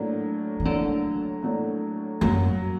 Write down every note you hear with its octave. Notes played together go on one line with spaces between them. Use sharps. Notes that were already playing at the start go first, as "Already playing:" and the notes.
Already playing: A2 F#3 A#3 D4
D#3
A2 D3 F#3 A#3 D4
A2 F#3 A#3 D4
F#2 F#3 A#3 F#4